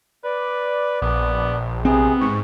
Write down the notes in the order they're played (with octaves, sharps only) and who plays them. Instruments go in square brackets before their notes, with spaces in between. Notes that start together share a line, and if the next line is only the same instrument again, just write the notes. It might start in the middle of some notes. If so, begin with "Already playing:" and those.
[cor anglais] B4 [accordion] D5
[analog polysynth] A#1 [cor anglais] B3
[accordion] C3 G#4 [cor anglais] B3 [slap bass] C4
[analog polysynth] G#2 [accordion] C#6